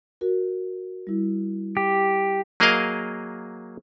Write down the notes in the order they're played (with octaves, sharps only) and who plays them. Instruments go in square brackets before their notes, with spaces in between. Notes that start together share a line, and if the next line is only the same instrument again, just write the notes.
[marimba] F#4 A#4
G3 E4
[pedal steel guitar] G4
[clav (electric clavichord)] F#3 A#3 G#4 A#4 D#5 F5